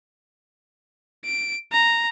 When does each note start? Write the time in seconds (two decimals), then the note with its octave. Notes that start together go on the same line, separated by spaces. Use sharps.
1.26 D7
1.72 A#5